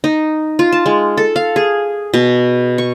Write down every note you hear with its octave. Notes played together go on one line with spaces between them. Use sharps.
D#4
F4
A5
G#3
A4
F5
G#4
B2
C#6